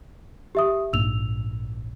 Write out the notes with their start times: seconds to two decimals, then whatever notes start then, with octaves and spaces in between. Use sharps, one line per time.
0.55 G4 E5 D#6
0.93 A#1 G#2 A#3 E6 F7